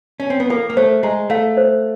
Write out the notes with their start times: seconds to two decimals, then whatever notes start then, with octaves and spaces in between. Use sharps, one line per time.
0.20 C#4
0.30 C4
0.40 B3
0.50 A#3 A4
0.70 A#3
0.77 A3 C5
1.03 G#3 A#5
1.30 A3 F5
1.57 C5